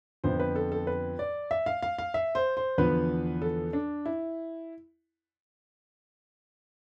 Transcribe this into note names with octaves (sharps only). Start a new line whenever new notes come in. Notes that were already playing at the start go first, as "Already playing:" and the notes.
F2 D3 F3 B3 C5
B4
A4
A4
B4
D5
E5
F5
F5
F5
E5
C5
C5
E2 D3 F3 B3 B4
A4
D4
E4